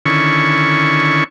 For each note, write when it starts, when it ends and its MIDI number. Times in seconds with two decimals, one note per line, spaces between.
0.06 1.24 50
0.06 1.24 51
0.06 1.24 61
0.06 1.24 64
0.06 1.24 85